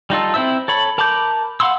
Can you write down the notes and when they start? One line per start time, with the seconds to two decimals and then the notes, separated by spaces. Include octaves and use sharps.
0.10 G3 D#4 F4 A4
0.34 C4 E4 C5 E5 E6
0.68 A4 C#5 B5
0.98 A#4 A5 B5 D6 G6
1.60 F5 F#5 B5 C6 E6